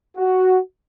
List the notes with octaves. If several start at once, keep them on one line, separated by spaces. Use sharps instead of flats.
F#4